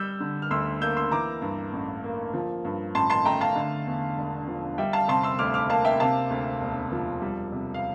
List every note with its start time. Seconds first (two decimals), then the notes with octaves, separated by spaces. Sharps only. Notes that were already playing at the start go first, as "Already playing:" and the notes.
Already playing: G3 E6 G6
0.20 D3
0.42 F6
0.51 D2 C6 E6
0.81 A#3 E6 G6
0.97 C6 E6
1.11 E3 A#5 D6
1.42 G2
1.73 A1
2.04 A#3
2.34 F3
2.65 G2
2.94 A1 A5 C6
3.10 A5 C6
3.25 A3 G5 A#5
3.41 F5 A5
3.56 D3
3.87 E2
4.17 E1
4.48 F3
4.78 G3 E5 G5
4.93 F5 A5
5.08 C3 A5 C6
5.23 C6 E6
5.39 D2 D6 F6
5.54 D6 F6
5.69 A#3 F5 A5
5.85 E5 G5
6.00 C3 F5 A5
6.31 D2
6.61 E1
6.92 F3
7.22 G3
7.52 C3
7.74 F5